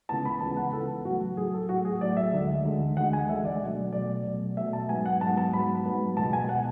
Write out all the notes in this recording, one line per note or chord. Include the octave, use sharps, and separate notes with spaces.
C#2 C#3 E3 B3 A5
B5
C#2 C#3 E3 B3 A5
F#5
C#2 C#3 E3 B3 A4
A2 F#3 A3 F#4
A2 F#3 A3 G#4
A4
A2 F#3 A3 F#4
G#4
A2 F#3 A3 D5
E5
D2 D3 G#3
D2 D3 G#3
D2 D3 G#3 F#5
G#5
D2 D3 G#3 E5
D5
B2 F#3 A3
B2 F#3 A3 D5
B2 F#3 A3
B2 F#3 A3 E5
A5
G#2 F#3 B3 G#5
F#5
G#2 F#3 B3 A5
A5
G#2 F#3 B3 B5
G#2 F#3 B3
C#2 B2 G#3 A5
G#5
G#5
B2 G#3 F#5